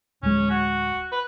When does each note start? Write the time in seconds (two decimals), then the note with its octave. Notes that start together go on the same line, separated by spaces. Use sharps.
0.23 D1 G#3 C#4
0.50 F#4
1.12 B4